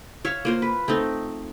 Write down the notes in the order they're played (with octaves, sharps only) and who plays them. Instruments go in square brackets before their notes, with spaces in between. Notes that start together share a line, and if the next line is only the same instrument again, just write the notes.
[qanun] C#5 E5 F5
A#3 F4 C5
B4
A3 C4 D#4